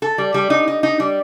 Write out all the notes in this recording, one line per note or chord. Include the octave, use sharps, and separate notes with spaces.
A4
G3
G3
D#4
D#4
D#4
G3